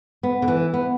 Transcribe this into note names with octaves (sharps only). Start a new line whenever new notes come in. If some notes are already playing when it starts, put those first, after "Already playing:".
B3
D3
E3
B3